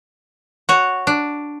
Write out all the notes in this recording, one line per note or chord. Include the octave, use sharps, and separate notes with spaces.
F#4 C#5
D4